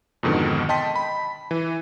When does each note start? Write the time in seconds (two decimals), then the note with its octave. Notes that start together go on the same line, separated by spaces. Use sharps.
0.23 F2 G#2 B2 D3 D#3
0.69 D#5 G5 A5 C6 B6
0.96 B5
1.51 E3